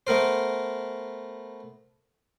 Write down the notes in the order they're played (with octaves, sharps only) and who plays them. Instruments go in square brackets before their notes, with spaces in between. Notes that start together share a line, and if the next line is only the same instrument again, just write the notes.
[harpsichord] A3 B3 A#4 C5